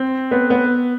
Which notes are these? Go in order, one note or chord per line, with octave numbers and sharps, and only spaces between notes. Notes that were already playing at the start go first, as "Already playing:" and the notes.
Already playing: C4
B3
B3